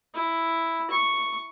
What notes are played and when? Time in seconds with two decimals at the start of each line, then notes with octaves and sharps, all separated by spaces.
0.14 E4
0.90 C#6